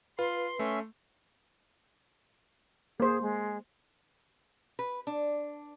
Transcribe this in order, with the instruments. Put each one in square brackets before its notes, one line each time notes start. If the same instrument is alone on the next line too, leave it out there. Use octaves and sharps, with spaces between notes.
[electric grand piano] F4 [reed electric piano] B4 [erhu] C6
[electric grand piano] A3 [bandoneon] C#4 E5
[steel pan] A#3 C5 [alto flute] G#4
[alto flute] G#3
[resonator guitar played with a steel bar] B4
D4